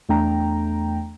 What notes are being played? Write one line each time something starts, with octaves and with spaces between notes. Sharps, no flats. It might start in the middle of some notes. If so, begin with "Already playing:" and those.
E2 A3 D4 G5 A#5